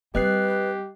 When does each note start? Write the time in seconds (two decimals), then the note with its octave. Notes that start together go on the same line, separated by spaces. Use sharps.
0.15 G3 C4 G4 B4 D#5 F#6 C7